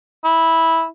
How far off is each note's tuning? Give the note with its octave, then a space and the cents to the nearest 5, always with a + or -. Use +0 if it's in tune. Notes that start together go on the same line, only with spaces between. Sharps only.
E4 -10